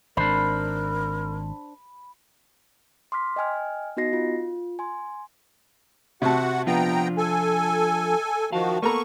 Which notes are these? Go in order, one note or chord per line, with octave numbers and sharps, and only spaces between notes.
G#1 D4 A#4 C5 B5
C6 D6 F6 B6
D#5 G5 G#5 F6
B3 D#4 F#4 D#5 A#6 C7
F4
G#5 C6
C3 F#4 F#5 A5
F3 B3 D4 F4 G5 A#5
A4 G#5
D#3 F3 F#4 F5 A5
A#3 B3 A4 A#5 C#6